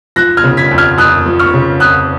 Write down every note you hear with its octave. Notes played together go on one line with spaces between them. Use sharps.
F3 F#6 A#6
F6 G#6
C#3
G#6 B6
F2
F6 G#6
F2 D#6 F#6
F3
C#6 F6
C#3
F2 D#6 F#6